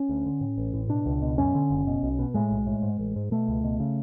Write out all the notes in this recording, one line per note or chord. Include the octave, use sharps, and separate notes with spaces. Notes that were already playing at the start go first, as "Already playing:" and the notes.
Already playing: C#4
D2
D3
A2
A1
A2
B2 D4
C#2
B2
F#2 C#4
D3
F#1
B2
B1
B2
A2 G#3
B1
A2
G#2
A1
G#2
B2 A3
C#2
B2
C#3